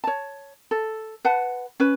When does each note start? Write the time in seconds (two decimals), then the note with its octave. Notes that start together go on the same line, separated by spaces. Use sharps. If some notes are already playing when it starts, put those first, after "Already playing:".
0.04 C#5 A5
0.71 A4
1.25 B4 F#5 A5
1.80 C#4 B4